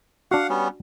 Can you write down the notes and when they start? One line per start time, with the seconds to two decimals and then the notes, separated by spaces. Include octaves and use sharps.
0.31 D4 F#4 F5 F#5
0.49 G3 B3 C#4